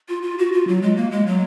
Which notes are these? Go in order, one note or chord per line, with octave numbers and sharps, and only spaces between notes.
F4
F4
F#4
F4
F#3
G#3
A#3
G#3
F#3